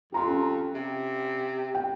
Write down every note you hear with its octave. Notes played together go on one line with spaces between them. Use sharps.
F2 G4 A#5 C6
C#4
C3
G5